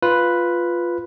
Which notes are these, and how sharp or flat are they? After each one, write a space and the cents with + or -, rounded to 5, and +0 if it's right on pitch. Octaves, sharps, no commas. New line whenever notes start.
F4 +0 B4 +0